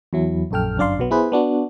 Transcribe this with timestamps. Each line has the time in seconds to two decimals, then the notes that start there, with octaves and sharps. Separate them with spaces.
0.13 E2 F#3 E4
0.51 A#1 F#2 A4 G5 F6
0.78 G1 F#2 D4 D5 F5 C6
0.99 B1 F#3 B3
1.11 B3 E4 G#4 B4 C5
1.32 B3 D4 F#4